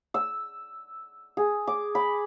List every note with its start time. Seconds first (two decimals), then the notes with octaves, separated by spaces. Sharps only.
0.14 E6
1.37 G#4
1.67 D6
1.95 B5